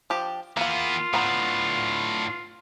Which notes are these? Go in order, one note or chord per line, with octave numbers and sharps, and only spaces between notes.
F3 D4 G4
E3 A#3 B3 F4 F5
A2 D3 B3 A#5